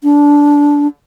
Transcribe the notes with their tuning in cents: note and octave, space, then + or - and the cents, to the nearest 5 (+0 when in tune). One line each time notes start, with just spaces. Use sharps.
D4 -15